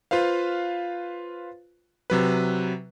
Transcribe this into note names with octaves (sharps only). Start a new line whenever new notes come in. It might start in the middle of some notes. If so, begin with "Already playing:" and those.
F4 B4 C5 F5
C3 F#3 B4